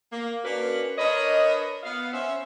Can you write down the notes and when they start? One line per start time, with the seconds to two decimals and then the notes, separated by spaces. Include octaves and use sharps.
0.12 A#3
0.44 A#3 C#4 D4 F#4 A#4 B4
0.98 D4 A#4 B4 C#5 D#5
1.83 B3 F5
2.12 C#4 C5 E5